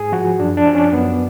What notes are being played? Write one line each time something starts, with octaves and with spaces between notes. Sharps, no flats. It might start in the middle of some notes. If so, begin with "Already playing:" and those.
Already playing: G#2 G#4
F3 F#4
F#2 D4
D4
F3
C#4
F#2 B3